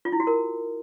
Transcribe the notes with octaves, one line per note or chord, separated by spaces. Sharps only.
F4
E4
F#4
A#4